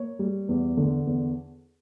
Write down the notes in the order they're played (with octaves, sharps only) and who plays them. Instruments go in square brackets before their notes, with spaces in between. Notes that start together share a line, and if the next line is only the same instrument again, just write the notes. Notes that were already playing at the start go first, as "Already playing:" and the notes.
Already playing: [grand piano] A#3 C#5
G3
E2
D3
E2